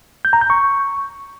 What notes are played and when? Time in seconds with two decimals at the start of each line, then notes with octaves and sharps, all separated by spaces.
0.25 G6
0.33 A#5
0.41 G6
0.50 C#6